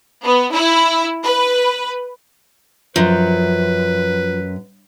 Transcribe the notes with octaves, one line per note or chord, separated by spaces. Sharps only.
B3
E4
B4
F#2 F3 B4